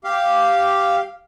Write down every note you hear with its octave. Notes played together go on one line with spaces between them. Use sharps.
G4 F5